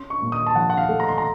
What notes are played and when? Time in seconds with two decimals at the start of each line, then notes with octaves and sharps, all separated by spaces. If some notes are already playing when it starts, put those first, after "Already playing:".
Already playing: C#4 C6
0.10 C#6
0.22 A#2
0.32 D#6
0.47 A5
0.55 F3 F#5
0.70 F#5
0.77 F5
0.89 A3
1.00 A#5
1.09 C6
1.18 A#5